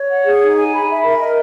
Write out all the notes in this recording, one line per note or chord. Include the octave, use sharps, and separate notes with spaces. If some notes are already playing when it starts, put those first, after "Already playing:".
Already playing: C#5
F#5
G#4
D#4
G#5
B5
E5
A#4
D#5